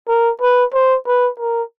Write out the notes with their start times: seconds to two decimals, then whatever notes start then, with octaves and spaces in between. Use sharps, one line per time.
0.08 A#4
0.42 B4
0.74 C5
1.07 B4
1.40 A#4